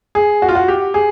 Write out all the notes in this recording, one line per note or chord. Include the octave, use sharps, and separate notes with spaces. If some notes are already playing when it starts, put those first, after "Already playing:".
G#4
F#4
F4
F#4
G4
G#4